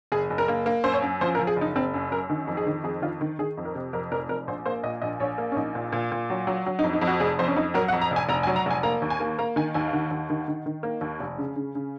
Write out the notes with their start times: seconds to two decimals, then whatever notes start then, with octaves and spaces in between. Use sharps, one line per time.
0.12 F#1 G#4
0.30 F#1
0.38 A#4
0.48 A#3
0.66 A#3
0.84 F#2 C5
0.94 C#5
1.02 F#2
1.21 F3 C5
1.35 A#4
1.39 F3
1.47 G#4
1.56 F#1 D#4
1.76 F#1 C4
1.94 F#2
2.11 F#2 A#4
2.30 D#3
2.47 F2
2.57 G#4
2.67 D#3
2.84 F2 G#4
3.02 D#3 F4
3.21 D#3
3.39 D#3 G#4
3.57 F2
3.65 A#4
3.75 C3
3.93 F2 A#4
4.12 F1 A#4
4.29 F2 A#4
4.47 A#1 C5
4.66 A#3 C5
4.83 A#2 D#5
5.02 A#1 D#5
5.20 A#1 C#5
5.38 A#3
5.52 C#4
5.56 A#1 D#4
5.75 A#2
5.92 A#2
6.12 A#2
6.30 F#3
6.47 F#3
6.66 F#3
6.79 D#4
6.84 F2
6.93 D#4
7.01 F2
7.07 F#4
7.20 F1 G#4
7.39 F2 C5
7.48 C#4
7.56 F2 D#4
7.74 F#3 A#4
7.88 F#5
7.93 F2
8.01 A#5
8.11 F1
8.16 G#5
8.29 F1 A#5
8.43 G#5
8.47 F#3
8.56 A#5
8.66 F1 G#5
8.83 A#3 A#5
9.02 D#2
9.10 G#5
9.20 A#3
9.39 A#3 A#5
9.56 D#3 G#5
9.74 D#2 G#5
9.87 F5
9.93 D#3 F#5
10.11 D#2
10.30 D#3
10.48 D#3
10.66 D#3
10.83 A#3
11.01 D#2
11.20 F1
11.38 C#3
11.56 C#3
11.75 C#3